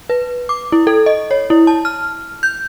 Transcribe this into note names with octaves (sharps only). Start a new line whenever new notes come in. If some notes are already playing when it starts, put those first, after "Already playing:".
B4
D6
E4
A4
D#5
C#5
E4
A5
F6
G6